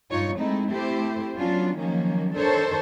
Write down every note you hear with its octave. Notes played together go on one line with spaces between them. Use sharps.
G2 D#4 F4 C#5
G#3 A3 C4 D#4 E4
A3 C4 E4 G4 C5
F#3 B3 C#4 D4 F4
D#3 F3 F#3 A#3 C#4
D#3 D4 A4 A#4 C5 C#5